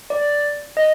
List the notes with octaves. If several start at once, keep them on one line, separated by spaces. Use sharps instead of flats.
D5
D#5